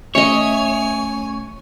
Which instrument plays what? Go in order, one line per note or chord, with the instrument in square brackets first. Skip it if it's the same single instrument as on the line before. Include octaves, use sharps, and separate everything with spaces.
[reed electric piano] A3 C#4 [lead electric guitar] C#5 [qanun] D#5 E5 [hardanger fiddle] G#5